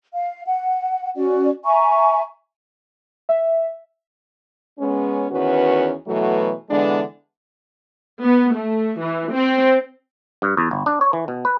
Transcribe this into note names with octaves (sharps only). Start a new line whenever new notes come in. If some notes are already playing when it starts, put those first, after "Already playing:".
F5
F#5
C#4 F#4 D5
E5 G#5 A#5 C#6
E5
G#3 B3 C#4
E2 D#3 C#4 F#4 B4
B2 E3 F#3 A3
D3 E3 G#3 B3 D4
B3
A3
E3
C4
G2
E2
G1
D4
C#5
E3
B2
B4